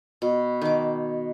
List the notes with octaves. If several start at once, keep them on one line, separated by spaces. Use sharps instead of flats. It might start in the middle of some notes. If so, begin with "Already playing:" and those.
B2
D#3 D6